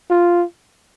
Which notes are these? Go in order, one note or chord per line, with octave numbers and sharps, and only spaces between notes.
F4